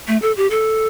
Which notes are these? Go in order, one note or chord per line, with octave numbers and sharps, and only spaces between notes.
A3
A4
G4
A4